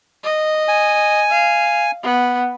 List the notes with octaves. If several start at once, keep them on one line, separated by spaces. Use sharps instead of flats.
D#5
G#5
F5
B3